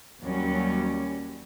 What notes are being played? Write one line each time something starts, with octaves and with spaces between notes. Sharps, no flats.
D#2 F#3 G3 C#4